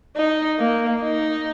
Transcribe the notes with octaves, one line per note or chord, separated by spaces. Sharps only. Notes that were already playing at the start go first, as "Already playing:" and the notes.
D#4
A#3
D#4